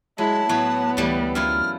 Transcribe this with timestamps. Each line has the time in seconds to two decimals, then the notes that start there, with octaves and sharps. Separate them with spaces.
0.18 F#3 G#3 E4 A5
0.49 A2 F#3 B3 F#4
0.97 D2 E3 G3 A3
1.35 F#2 E4 F4 F6